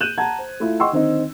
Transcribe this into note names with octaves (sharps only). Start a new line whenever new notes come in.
F#6 G6 D#7 E7 F#7
F#5 A5 A#5 G#6
C5
A3 E4 F4
D#5 F#5 G5 C6 C#6 E6
D3 D#3 C4 D#4